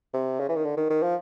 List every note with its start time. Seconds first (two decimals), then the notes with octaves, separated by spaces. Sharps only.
0.14 C3
0.40 C#3
0.49 E3
0.56 D#3
0.65 D3
0.77 D#3
0.90 D#3
1.03 F3